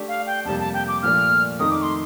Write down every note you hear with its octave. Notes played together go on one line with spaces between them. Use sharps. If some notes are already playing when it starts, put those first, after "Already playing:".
Already playing: A3 D4 G4 D5
F5
G5
F2 C3 G3 A#3 A5
A5
G5
D6
A#2 F3 A3 D4 F6
F2 D#3 A3 D#4 A#4 D#6
D6
C6